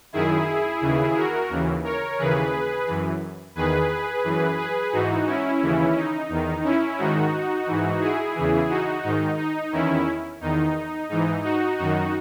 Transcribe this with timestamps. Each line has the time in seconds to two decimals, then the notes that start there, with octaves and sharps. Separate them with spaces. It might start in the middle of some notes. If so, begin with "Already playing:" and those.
0.13 F#2 D#3 E4 G#4
0.81 D#2 C#3 E3
1.16 F#4 A#4
1.50 D#2 C#3 E3
1.84 A#4 C#5
2.18 D#2 C#3 E3 G#4 B4
2.87 F#2 E3
3.55 E2 D#3 G#4 B4
4.24 F#2 E3
4.58 G#4 B4
4.92 G#2 E3 D#4 F#4
5.26 C#4 E4
5.61 D#2 C#3 E3
5.96 D#4
6.29 E2 D#3
6.64 C#4 E4
6.98 G#2 D#3 D#4 F#4
7.67 G#2 E3
8.00 E4 G#4
8.35 E2 C#3 E3
8.69 D#4 F#4
9.03 G#2 D#3 D#4
9.38 D#4
9.72 E2 D#3 C#4 E4
10.41 E2 D#3 D#4
11.09 G#2 E3 D#4
11.43 D#4 F#4
11.78 F#2 D#3 D#4 F#4